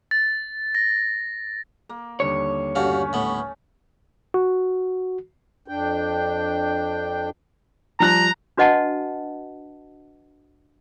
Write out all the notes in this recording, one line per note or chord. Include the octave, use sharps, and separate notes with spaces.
A6
A#6
A#3
D#2 D3 G3 C#5
G2 A3 C#4 F#4 F5
A2 B3
F#4
F2 D4 G5
F3 G3 A#5 F#6
D4 F#4 B4 D#5 F#5 A5